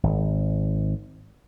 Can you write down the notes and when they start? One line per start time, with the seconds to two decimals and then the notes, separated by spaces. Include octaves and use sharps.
0.03 G#1